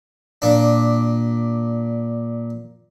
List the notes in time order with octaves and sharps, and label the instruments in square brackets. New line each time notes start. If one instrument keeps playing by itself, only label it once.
[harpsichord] A#2 D4